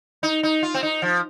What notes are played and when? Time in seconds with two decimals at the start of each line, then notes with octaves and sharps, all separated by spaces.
0.23 D#4
0.43 D#4
0.63 F4
0.74 C4
0.83 D#4
1.02 F3